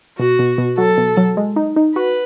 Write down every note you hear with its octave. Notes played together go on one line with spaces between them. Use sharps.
B2 F#4
B2
B2
F#3 A4
B2
F#3
G#3
D#4
D#4
F#4 B4